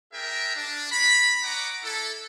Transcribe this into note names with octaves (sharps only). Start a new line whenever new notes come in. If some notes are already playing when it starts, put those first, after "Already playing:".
D4 G#4 A#4 E5 G5
D4
C#5 A#5 B5
C#5 D#5 F#5 A#5 D6
E4 A4